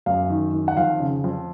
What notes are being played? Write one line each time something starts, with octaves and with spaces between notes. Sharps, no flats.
F#2 F5
D#3
D#3
F#5
F2 F5
C#3
F2